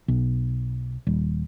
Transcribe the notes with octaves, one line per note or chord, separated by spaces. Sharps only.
B1
D#1